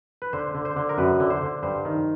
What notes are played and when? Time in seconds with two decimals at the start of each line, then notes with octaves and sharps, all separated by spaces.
0.22 B4
0.33 D3 C5
0.55 D3
0.65 C5
0.76 D3
0.89 A#4
0.98 F#2 B4
1.20 D3
1.30 C5
1.42 D3
1.63 G2 C5
1.85 D#3